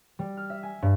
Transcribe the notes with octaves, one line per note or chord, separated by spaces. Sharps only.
G3
F6
E5
G#5
G2